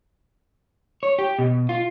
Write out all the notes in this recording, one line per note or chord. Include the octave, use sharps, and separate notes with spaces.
C#5
G4
B2
F4